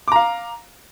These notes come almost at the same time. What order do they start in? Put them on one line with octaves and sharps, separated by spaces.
D6 A#5 F5